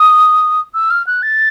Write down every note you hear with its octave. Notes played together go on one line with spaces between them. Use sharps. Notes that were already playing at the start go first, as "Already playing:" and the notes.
Already playing: D#6
E6
F6
F#6
A6